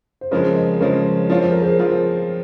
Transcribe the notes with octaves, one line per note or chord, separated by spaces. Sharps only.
C5
C#3 F3 G#3 C4 A#4 C#5
C5 D#5
C#3 F3 G#3 C4 A#4 C#5
F3 C4 F4 C#5
C5
A#4
G#4 C5
F3 C4 F4